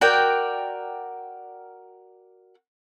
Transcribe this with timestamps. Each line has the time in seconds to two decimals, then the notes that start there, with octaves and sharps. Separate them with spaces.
0.01 F#4 A#4 D5 G5